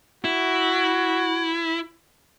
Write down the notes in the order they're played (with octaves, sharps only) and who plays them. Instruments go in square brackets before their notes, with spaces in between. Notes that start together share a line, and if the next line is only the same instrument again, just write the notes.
[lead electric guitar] E4 [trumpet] F#4